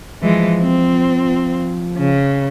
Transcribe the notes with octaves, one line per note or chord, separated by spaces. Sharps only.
E3 F3 G#3
C4
C#3